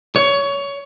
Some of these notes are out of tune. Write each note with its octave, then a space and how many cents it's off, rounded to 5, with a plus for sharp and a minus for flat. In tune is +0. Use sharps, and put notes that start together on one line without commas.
C#5 +20